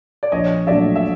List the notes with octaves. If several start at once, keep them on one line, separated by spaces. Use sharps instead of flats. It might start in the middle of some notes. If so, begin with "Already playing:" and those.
D5
A#1 C#5 D#5
A#2 F#3 A3 D4 D5 E5
E5